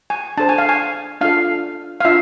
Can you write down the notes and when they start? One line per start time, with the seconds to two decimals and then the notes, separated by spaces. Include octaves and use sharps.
0.10 G#5
0.37 D4 A4 C5 A5
0.49 G#5
0.58 F5
0.69 G#5
1.21 D4 F4 A4 F5
2.00 F5
2.05 D4 F4 E5